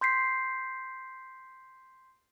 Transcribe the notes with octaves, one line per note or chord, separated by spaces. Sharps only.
C6 G6 B6 C7